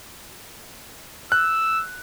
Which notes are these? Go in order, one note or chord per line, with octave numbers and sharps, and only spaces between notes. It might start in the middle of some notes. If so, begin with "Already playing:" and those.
E6 F#6